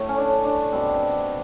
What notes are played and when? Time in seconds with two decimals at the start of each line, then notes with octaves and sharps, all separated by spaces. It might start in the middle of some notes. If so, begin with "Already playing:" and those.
Already playing: A2 A3
0.09 C#4
0.17 D4
0.45 D4
0.71 B2 G3 C4